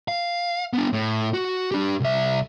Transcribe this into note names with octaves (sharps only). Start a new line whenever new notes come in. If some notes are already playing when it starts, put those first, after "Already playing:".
F5
B3 D4
A2
F#4
D4 G4
C2 E5